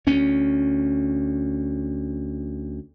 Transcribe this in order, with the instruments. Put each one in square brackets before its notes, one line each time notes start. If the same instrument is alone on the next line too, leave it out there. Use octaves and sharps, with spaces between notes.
[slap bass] D2 C#4